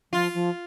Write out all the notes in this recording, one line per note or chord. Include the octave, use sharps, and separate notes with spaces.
F3 F4
F3